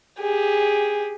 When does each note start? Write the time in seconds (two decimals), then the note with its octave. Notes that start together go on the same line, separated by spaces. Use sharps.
0.20 G4 G#4